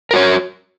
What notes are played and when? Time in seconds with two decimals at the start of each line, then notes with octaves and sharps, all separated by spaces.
0.11 A#4
0.13 F#4
0.16 C#5